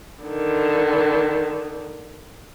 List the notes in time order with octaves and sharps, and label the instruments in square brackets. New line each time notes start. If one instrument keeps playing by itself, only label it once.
[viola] D3 D#3